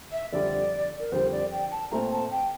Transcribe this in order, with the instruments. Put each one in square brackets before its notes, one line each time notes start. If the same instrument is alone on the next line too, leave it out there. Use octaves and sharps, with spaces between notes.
[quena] E5
[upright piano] F2 D3 G3 [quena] D5
[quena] A#4
[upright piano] F2 D3 G3 [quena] C5
[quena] D5
G5
A5
[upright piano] A#2 A3 C4 F4 [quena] A#5
[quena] A5
G5